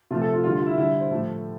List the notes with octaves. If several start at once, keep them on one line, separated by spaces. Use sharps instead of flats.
C3 F3 A3 F4
A4
F4
D3 G3 F4
F4
E4
D3 G3 E4
C5
A2 F3 A3